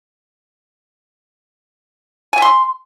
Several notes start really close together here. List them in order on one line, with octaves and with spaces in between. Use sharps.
G#5 E5 C6